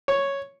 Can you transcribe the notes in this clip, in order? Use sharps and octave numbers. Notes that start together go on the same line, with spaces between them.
C#5